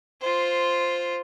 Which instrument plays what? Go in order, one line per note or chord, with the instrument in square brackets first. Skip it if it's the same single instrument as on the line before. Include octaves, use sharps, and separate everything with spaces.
[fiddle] F4 C5